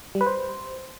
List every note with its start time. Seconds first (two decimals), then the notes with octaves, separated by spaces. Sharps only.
0.15 G3
0.21 B4
0.26 C5